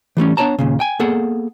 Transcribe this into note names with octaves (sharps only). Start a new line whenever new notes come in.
E3 G3 A3 C#4
B3 D4 F4 C#5 A5 A#5
D#2 A#2 C#3
G5 G#5
A#3 B3 G#4 A4 F#5